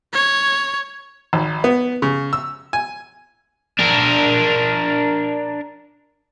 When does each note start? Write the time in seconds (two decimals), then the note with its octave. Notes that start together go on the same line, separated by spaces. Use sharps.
0.13 C#5
1.33 G#1
1.64 B3
2.02 C#3
2.33 E6
2.73 G#5
3.79 D4 A#4